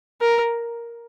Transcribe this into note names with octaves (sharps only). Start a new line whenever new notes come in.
A#4